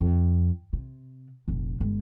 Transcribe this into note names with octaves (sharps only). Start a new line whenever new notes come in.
F2
C3
F1 A#1
G1 G#3